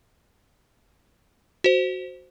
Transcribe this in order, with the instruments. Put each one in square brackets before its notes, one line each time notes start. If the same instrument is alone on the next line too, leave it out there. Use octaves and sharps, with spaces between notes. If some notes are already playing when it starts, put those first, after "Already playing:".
[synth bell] F#4 C5